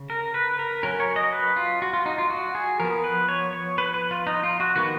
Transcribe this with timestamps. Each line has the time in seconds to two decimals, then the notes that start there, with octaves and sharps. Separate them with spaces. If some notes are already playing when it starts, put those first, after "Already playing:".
Already playing: C#3
0.10 A#4
0.34 B4
0.59 A#4
0.83 F#3 C#4 A#4
1.00 C#5
1.16 D#5
1.33 B4
1.56 F4
1.82 F#4
1.93 F4
2.06 D#4
2.18 F4
2.30 F#4
2.55 G#4
2.80 F3 B3 A#4
3.04 B4
3.29 C#5
3.53 C#5
3.78 B4
3.94 B4
4.11 F4
4.27 D#4
4.43 F4
4.60 F#4
4.76 D#3 G#3 B3 F#4